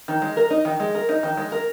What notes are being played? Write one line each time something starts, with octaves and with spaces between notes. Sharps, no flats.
D#3
G#3
A#4
D#4
D#3
G#3
A#4
D#4
D#3
G#3
A#4